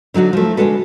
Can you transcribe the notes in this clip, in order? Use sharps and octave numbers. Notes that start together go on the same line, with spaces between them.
D3 F#3 D#4 F#4
F3 A3
D3 G#3 F#4 A4 B4